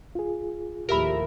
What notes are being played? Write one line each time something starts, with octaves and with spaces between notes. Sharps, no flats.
F4 G#4
D#2 A2 F3 G4 A#4 E5 B5